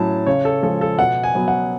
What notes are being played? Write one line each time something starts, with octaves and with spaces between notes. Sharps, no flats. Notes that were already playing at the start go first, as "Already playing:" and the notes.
Already playing: A2 F#3 C#4 A5
C#3 C#5
A4
F3 G#3 A4
A4
B2 F#5
G#5
F#3 B3
F#5